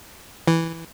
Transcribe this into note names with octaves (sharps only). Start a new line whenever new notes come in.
E3